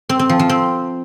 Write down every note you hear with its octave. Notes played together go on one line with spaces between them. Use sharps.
C4
C4
F3
F3
C4